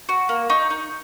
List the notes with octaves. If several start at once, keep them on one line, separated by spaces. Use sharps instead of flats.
F#4
A#3
D#4 C#6
D#4